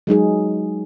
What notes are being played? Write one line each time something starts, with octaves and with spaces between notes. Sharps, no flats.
F#3 G#3 D#4 G#4